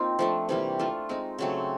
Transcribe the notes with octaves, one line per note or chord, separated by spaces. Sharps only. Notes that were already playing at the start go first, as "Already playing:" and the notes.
Already playing: A#3 C4 D#4 F4
F3 A3 D4
C3 E3 G3 A#3
A3 D4 F4
G#3 C4 D#4
C#3 F#3 A3 C4